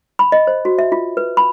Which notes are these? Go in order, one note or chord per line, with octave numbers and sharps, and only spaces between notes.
B5
D#5
C5
F#4
E5
F4
B4
B5